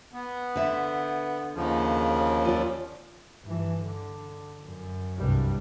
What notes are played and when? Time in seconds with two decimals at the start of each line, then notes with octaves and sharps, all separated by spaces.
0.13 B3
0.56 D3 E5
1.54 D#2 C#3 F3
2.45 F4 D5
3.44 G2 E3
3.83 D3
4.65 F#2
5.17 C2 G2 G3